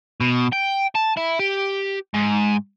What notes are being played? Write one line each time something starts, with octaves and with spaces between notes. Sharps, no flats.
B2
G5
A5
E4
G4
G#2